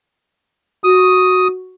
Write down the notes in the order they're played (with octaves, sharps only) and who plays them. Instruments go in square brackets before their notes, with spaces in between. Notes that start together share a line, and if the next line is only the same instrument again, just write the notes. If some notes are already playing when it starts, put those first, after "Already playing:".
[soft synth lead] F#4 [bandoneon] D#6